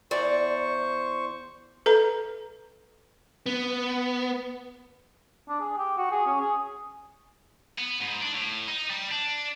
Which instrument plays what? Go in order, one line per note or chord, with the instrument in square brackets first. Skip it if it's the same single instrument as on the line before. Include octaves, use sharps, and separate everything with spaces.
[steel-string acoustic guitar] E2 D5 A#5 [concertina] C5 C#6
[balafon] A4 B4 A#5
[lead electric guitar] B3
[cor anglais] D4
G#4
G4
F#4
G#4
C#4
G#4
[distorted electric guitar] B3
G#2
D4
A2
D#4
G3
D4